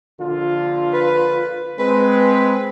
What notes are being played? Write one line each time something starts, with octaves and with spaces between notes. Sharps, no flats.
A#1 D3 F4
B4
G#3 C4 B4